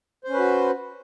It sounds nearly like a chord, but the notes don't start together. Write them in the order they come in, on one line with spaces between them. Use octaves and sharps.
C5 C#4 B4 F#4